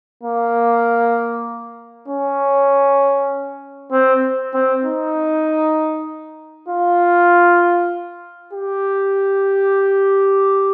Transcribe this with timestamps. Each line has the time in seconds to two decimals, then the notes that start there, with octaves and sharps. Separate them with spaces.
0.23 A#3
2.08 C#4
3.92 C4
4.54 C4
4.84 D#4
6.68 F4
8.53 G4